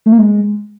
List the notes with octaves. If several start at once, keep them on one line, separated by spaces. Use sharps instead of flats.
A3
A#3
G#3